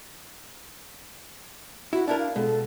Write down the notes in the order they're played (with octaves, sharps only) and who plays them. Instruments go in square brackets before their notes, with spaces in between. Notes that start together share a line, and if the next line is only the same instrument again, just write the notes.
[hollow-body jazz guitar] E4 [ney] F#4
[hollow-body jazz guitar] D4 E4 A#4 [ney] A5
[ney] F5
[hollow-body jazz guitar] B2 [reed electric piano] G#3 [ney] A4